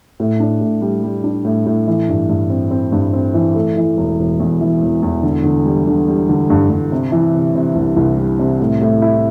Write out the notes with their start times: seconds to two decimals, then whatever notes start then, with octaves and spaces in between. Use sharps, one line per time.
0.20 A2
0.40 D4
0.61 A2
0.82 G3
1.03 G3
1.24 D4
1.45 A2
1.66 A2
1.87 E3
2.09 G2
2.29 G2
2.50 C4
2.71 C4
2.92 G2
3.13 C4
3.34 E3
3.55 A3
3.77 E3
3.97 E1
4.19 E1
4.40 E2
4.61 E3
4.82 E1
5.02 E2
5.23 D3
5.44 D3
5.65 G3
5.87 D3
6.08 G3
6.29 D3
6.50 G2
6.70 G2
6.92 C3
7.12 E3
7.34 C3
7.55 C3
7.75 C2
7.96 C2
8.18 G3
8.39 C3
8.60 A2
8.81 A2
9.02 E4